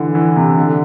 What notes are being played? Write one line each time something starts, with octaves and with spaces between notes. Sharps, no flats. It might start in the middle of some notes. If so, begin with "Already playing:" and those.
Already playing: D3 E3
E3
C3
D3